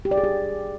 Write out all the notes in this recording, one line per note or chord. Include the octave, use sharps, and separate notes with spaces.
G4
D5
G#4
G4